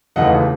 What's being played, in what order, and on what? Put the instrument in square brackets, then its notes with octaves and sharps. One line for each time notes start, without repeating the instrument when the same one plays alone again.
[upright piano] E1 D#2 C#3 E3 A3 D#5 F#5